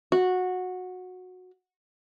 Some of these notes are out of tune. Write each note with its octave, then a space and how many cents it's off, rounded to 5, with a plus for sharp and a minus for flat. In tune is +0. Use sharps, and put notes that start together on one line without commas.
F#4 -15